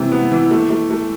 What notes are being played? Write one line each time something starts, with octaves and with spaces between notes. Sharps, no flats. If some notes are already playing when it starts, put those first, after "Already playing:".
Already playing: C3 E3
B3
E3
A3
A3
A3